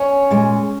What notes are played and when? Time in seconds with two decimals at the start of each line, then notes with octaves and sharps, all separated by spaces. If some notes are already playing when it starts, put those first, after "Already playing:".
Already playing: C#4 C#5
0.31 A#2 G#3